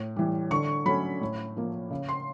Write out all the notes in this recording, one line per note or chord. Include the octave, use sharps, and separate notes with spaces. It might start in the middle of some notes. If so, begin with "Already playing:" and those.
Already playing: A2
E3 G3
D3 C#6
F#3 A3 C#4 B5
A2
F3 A#3
C#3
C6